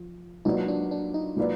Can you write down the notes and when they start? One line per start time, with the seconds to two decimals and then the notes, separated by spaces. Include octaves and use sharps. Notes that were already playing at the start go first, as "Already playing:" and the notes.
Already playing: F3
0.45 F#3 A#3 D#4 F4 B4 D5
0.68 D4
0.91 D4
1.14 D#4
1.37 F#3 A#3 F4 B4 D5